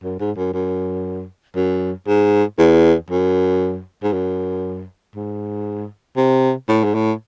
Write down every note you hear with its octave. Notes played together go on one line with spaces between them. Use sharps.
F#2
G#2
F#2
F#2
F#2
G#2
E2
F#2
G#2
F#2
G#2
C3
A2
G#2
A2